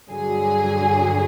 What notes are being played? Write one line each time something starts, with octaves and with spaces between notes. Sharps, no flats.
G2 D3 F#3 G#4